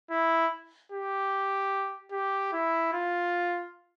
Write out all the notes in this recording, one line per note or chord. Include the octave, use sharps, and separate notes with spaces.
E4
G4
G4
E4
F4